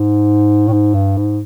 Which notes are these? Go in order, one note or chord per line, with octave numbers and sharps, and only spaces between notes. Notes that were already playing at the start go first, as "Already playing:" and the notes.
Already playing: G#2
A2
G#2
G2
G#2